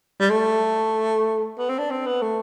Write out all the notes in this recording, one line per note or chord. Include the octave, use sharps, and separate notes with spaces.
G3
A3
B3
C4
D4
C4
B3
A3